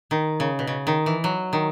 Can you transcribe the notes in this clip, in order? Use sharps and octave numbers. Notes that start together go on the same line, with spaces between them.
D#3
C#3
B2
C#3
D#3
E3
F#3
D#3